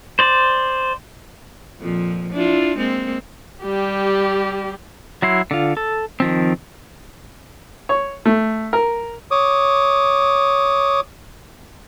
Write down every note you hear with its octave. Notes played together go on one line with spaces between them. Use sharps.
C5 D5
F2 A#2 F3
D4 E4 F4
G#3 A#3 C4
G3 G4
F#3 E4 C6
D3 F4
A4
D#3 F3 C4
C#5
A3
A#4
C#5 D6 D#6